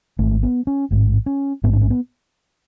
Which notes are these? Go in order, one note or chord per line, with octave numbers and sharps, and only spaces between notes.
G#1 G#2 A3
B3
C#4
A1 G#2
C#4
A1 G#2 B3
D4
C#4
B3